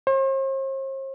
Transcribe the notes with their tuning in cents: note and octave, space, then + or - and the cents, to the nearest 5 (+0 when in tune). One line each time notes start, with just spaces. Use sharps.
C5 +45